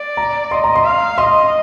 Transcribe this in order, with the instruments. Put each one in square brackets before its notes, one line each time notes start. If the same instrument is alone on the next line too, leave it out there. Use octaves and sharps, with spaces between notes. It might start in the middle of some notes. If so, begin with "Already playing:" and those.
Already playing: [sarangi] D5
[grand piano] A#5
[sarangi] D#5 [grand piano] C6
[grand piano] A#5
C6
[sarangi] F5
[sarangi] D#5 [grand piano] C6